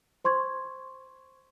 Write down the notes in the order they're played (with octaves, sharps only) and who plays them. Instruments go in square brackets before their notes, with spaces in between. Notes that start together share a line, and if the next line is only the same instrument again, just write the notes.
[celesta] C5 C6 C#6 G#6